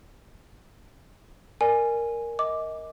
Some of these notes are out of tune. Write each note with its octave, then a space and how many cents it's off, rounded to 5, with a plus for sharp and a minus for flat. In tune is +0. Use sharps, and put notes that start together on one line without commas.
A#4 +0 D5 +0 G#5 +0
D#5 +25 D6 -5